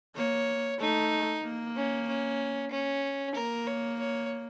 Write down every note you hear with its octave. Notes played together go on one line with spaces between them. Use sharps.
A#3 C#5
A3 D#4
A#3
C#4
C#4
C#4
A#3 A#4
C#5
C#5